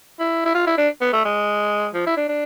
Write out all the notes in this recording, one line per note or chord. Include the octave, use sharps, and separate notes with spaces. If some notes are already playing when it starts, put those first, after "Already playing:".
E4
E4
F4
E4
D4
B3
A3
G#3
F3
E4
D4
D4